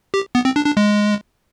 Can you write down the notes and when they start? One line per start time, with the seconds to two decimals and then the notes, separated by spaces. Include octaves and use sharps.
0.14 G4
0.35 B3
0.45 C4
0.56 D4
0.66 D4
0.77 G#3